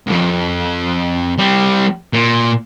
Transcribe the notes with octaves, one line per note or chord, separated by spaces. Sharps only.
C2 F2
G3 C4
A#2